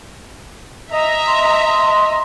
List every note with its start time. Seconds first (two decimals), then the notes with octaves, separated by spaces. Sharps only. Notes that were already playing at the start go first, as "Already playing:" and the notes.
0.93 D#5 E5 A#5
1.27 C6